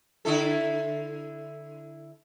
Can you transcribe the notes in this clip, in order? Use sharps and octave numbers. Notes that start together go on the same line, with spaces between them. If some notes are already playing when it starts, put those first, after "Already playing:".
D3 E4 A4